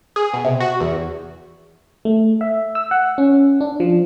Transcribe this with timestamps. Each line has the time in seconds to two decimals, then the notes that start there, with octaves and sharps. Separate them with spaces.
0.16 G#4
0.33 B2
0.45 C3
0.60 F#4
0.80 E2
2.05 A3
2.41 E5
2.75 E6
2.91 F#5
3.18 C#4
3.61 D4
3.80 F3